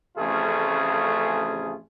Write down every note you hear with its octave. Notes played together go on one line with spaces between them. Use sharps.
A1 F2 C#3 A3 F4 G#4